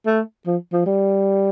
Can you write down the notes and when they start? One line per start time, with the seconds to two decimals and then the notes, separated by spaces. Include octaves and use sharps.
0.06 A3
0.47 F3
0.73 F3
0.86 G3